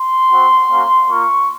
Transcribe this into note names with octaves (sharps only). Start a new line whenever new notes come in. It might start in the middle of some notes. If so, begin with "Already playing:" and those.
Already playing: C6
C4 F#4
A#3 C#4 F#4
A#3 F4 C#6